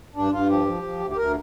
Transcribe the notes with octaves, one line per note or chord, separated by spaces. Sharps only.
G2 D4
G2 F4
F3 G4
F3
F3
D2
G4
D2 A#4